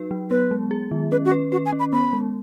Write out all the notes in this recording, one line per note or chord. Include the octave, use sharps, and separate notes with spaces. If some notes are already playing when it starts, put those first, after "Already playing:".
Already playing: F#3 D#4 F#4 B4
F#3
B3 B4
G#3
G#4
D#3
C#4 B4
F#4
B4
F#4 B4
G#5
C#4
B5
B3 B5
G#3